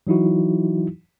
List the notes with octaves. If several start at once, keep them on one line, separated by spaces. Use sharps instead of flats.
E3 F#3 D#4 E4 F#4